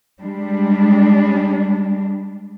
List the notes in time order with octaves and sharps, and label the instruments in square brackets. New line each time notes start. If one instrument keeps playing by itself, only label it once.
[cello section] G3 G#3 D4